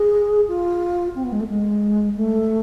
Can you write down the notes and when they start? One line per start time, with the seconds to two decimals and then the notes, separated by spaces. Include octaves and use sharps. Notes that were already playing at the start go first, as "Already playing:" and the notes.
Already playing: G#4
0.47 F4
1.15 C4
1.23 B3
1.32 G#3
1.40 A3
1.48 G#3
2.15 A3